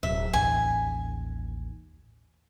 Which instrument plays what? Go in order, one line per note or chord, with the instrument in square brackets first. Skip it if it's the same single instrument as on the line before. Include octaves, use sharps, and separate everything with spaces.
[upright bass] D1 [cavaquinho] E5
[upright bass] A1 D#2 [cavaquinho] G#5